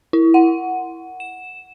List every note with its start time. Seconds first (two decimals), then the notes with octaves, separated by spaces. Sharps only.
0.13 E4
0.34 F#5
1.20 E7